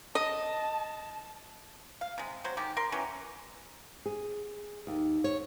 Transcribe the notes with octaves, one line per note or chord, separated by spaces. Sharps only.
D#5 A5
F5
C3 G#3
F#3 C5
D#3 G#3 G4
A#4 C6
E3 F#3 C#4 G4
G#4
D#2
C#5